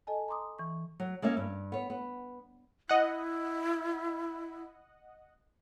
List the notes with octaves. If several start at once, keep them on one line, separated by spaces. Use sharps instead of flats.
A4 D#5 G#5 A5
A#5 C6 D6 D#6
E3 C#6
F#3
G#3 A#3 C#4 E5
G2
B3 C#5
B3
E4 D#5 F#5